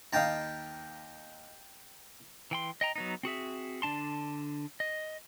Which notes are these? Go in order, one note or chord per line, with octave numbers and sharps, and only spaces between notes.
D#2 D#5 F5 G5 A5 A#5
E3 G5 C6
D#5 G5 A#5
F#3 B3 D#4
C4 F#4 G#4 E5
D3 D4 A5 C6
D#5